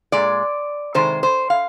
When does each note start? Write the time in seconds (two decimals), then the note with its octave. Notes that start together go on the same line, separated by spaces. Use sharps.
0.12 A#2 G#3 D5
0.94 C3 D#3 G#3 C5
1.23 C5
1.50 F5